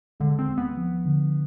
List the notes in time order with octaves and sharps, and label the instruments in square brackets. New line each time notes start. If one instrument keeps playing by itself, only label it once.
[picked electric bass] D3 [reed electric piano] G#3
[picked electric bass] C4
[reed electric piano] D#2
[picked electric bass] B3
[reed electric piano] F3
D3